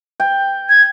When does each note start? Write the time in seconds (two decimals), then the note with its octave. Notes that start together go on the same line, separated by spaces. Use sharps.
0.20 G5
0.69 G#6